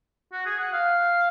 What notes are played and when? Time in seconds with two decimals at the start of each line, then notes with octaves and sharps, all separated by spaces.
0.33 F#4
0.46 G#4
0.59 F#5
0.74 F5